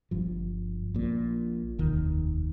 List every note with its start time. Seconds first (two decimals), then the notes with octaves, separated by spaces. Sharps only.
0.11 G1 G2 F3
0.94 A#1 A#2
1.78 F1 D#2 D#3